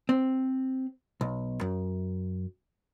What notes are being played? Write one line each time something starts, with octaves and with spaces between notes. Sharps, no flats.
C4
B1
F#2